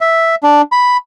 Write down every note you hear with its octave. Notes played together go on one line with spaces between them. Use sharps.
E5
D4
B5